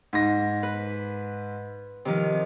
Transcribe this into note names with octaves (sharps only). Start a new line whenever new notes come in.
G#2 A#6
B4
C3 D#3 F3